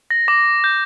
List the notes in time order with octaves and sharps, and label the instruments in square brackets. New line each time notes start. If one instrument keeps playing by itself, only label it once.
[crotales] A#6
D6 A#6
G6